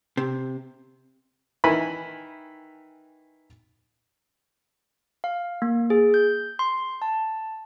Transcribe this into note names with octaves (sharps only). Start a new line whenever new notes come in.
C3
D#3 E3 G#5 B5
F5
A#3
G#4
G6
C6
A5